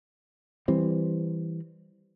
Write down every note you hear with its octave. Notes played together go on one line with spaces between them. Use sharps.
E3 G3 C4